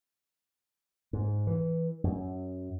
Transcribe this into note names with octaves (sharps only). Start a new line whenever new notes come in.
G#2
E3
F#2